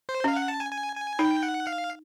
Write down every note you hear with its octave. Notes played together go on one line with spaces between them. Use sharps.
C5
C#4 F5
F#5
A5
G#5
G#5
G#5
D#4 G5
F#5
F5